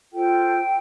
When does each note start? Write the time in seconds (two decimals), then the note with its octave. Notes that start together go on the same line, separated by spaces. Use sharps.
0.11 F4 A4 C5 G5